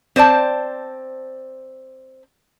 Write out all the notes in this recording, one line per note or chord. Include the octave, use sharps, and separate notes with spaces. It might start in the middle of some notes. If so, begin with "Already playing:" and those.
C4 C5 D5 A5